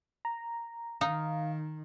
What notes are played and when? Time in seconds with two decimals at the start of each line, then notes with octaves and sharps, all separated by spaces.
0.25 A#5
1.01 D#3 D#4 F5